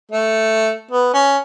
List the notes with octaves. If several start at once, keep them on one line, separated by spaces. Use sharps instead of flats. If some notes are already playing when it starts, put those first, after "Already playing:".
A3
B3
C#4